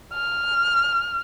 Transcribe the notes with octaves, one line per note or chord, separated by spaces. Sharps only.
F6